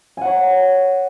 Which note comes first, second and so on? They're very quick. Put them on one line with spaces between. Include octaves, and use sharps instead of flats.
G#5 F#5 C#5